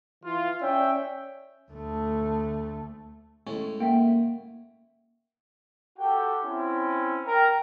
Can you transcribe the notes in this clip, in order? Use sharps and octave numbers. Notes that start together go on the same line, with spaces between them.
E3 F4
C#4 D5 E5 G5
D2 A3
A2 G#3 C#4
A#3 E5 F#5 G5
F#4 G4 A4 G5
C4 C#4 E4
A#4 G5